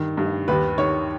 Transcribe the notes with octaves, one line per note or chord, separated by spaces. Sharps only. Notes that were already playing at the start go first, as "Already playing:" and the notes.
Already playing: G2 D#3
G2
D#2 B4
D#3 C#5